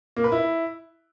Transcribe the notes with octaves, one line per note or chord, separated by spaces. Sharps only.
A#3
B4
E4